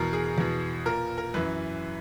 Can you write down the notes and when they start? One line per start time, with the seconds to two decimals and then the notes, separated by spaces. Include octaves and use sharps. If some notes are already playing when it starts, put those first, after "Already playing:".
Already playing: E2 B2 A#4
0.13 G#4
0.38 E2 B2
0.85 A#2 A#4
1.18 A#4
1.34 F#2 E3 B4